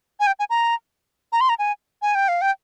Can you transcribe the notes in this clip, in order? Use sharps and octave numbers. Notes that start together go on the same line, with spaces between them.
G#5
G5
G#5
A#5
A#5
C6
A#5
G#5
G#5
G5
F5
G5